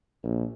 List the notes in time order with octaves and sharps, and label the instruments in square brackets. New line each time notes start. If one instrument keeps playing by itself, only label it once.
[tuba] A#1